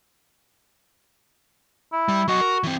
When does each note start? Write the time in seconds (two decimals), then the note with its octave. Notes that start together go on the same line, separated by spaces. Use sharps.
1.92 E4
2.08 G3
2.28 F#3 F#4 D#5
2.41 A#4
2.63 E3 C4